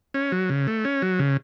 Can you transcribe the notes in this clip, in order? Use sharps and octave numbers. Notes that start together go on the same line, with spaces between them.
C#4
F#3
C#3
A3
C#4
F#3
C#3